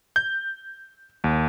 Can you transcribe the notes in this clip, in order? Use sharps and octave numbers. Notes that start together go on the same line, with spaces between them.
G6
D#2